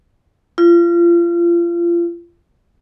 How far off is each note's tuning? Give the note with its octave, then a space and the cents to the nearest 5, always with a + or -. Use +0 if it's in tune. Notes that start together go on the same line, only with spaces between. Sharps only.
F4 -30